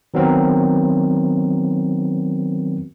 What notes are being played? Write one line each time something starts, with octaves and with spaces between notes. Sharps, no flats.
D#3 F#3 B3 C4 A#4